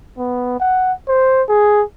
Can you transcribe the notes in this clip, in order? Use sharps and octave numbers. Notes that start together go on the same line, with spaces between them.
B3
F#5
C5
G#4